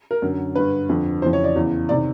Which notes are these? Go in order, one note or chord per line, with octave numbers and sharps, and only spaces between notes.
A#4
F#2 D3
G2 D3 B4
F2 D3
F2 C#3 E3 C5
C#5
D5
E2 C#3 E3
C3 D#3 D5